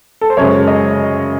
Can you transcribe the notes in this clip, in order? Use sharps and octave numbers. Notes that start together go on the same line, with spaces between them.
A4
C5
F#2 C#3 G#3 C#5
D#5